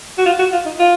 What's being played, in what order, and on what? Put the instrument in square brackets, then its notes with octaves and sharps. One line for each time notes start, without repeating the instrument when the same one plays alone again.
[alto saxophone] F#4
F4
F#4
F4
D#4
F4